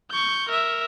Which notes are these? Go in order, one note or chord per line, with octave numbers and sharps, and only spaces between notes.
C#6 G6
A#4 E5